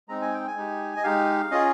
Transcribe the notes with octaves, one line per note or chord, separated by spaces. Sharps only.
G#3 C4 D#4 A#5
G#5
G5
G#5
G#3 D#4 G4
D#5
G#3 D#4 G4 F5
C#4 F4 G#4 D#5